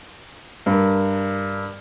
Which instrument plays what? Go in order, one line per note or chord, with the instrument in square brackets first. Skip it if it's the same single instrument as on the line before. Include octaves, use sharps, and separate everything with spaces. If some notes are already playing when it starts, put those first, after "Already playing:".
[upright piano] G2 A#4